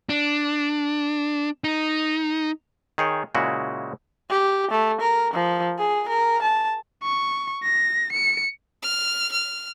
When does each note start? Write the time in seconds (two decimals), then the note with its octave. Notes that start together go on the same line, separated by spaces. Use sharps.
0.09 D4
1.64 D#4
2.98 D#3 G#4 C#5 G5
3.35 A#2 C#3 G#3 E4 F#4
4.30 G4
4.71 A3
5.01 A#4
5.34 F3
5.79 G#4
6.08 A#4
6.42 A5
7.03 C#6
7.63 A#6
8.13 C#7
8.82 F6
9.32 F6